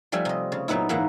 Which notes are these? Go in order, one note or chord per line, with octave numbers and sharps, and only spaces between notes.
F3 G3 A3 E5 G#5
C3 D#5
C#3
A#2 F#3 B3 D#4 E4
G#2 E3 A#3 E5 F#5